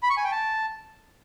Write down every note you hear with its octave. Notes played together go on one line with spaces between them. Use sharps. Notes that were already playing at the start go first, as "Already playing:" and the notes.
B5
C#6
G#5
G5
A5